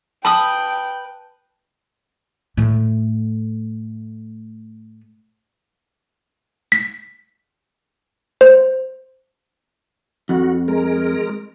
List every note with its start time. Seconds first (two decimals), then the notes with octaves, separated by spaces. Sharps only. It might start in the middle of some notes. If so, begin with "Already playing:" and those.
0.25 B4 G5 A5 B5 D#6
2.57 A2 A3
6.72 B6
8.41 C5
10.29 F2 F#4
10.68 G#3 A#4